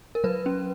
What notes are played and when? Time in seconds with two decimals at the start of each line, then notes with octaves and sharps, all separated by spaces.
0.15 A#4
0.24 F#3 B4
0.46 C#4